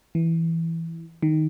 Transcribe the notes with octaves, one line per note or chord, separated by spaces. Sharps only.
E3
D#3